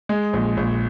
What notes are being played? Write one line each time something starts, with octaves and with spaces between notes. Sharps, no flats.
G#3
A#1
A#1